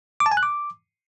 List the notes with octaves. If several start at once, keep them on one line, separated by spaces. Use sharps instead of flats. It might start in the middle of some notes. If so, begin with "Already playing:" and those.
D6
A5
G#5
F#6
D6